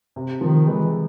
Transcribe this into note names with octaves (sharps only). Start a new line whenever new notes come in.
C3
D#3 F3
E3 G#3